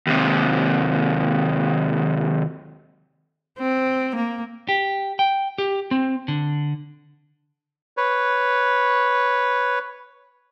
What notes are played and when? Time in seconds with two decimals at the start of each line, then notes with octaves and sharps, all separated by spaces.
0.07 D#2 C3
3.58 C4
4.15 A#3
4.69 G4
5.19 G5
5.58 G4
5.91 C4
6.28 D3
7.97 B4 C#5